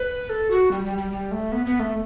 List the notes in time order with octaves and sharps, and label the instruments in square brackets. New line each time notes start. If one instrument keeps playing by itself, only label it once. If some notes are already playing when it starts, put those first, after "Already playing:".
Already playing: [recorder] B4
A4
F#4
G3
G3
G3
G3
A3
B3
B3
A3